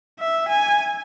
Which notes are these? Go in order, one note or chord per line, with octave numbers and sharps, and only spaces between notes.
E5
G#5